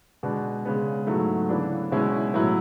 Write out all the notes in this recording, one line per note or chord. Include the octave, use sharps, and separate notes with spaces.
B2 G#3 B3 D4
C#3 G#3 B3
G#2 F#3 A3 E4
C#3 E3 B3 D4
B2 G#3 C#4 E4
A2 F#3 B3 E4